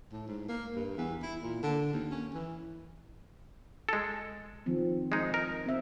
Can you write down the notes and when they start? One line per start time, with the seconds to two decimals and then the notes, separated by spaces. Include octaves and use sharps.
0.12 A2
0.27 G#2
0.49 A#3
0.75 G2
0.97 E2
1.22 E4
1.42 A#2
1.63 D3
1.93 D#2
2.11 C#4
2.34 E3
3.89 G#3 A4
4.66 D#3 F3 C4
5.12 G#3 D#4 D#5
5.34 A#4
5.66 C4 E5